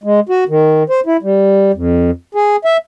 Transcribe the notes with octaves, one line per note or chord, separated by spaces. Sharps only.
G#3
F#4
D#3
C5
E4
G3
F2
G#4
E5